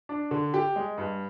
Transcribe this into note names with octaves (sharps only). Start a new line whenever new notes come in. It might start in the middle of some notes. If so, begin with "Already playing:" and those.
D4
D3
G4
G#3
G2